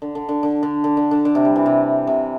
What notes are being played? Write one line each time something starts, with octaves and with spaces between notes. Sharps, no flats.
D3
D3
D3
D3
D3
D3
D3
D3
D3
C3
G3
E3
C3
C3